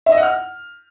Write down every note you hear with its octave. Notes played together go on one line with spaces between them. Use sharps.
E5
D#5
F#5
F6